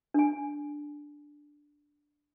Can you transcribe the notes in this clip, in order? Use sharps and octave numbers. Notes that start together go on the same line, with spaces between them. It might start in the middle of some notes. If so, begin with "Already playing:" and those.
D4 G#5